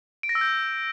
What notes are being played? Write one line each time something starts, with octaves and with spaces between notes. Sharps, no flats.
D7
A#6
E6
G6